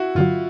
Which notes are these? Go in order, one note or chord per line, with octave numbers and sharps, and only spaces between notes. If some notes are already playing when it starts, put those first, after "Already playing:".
Already playing: E4 F#4
G2 D3 F#3 F4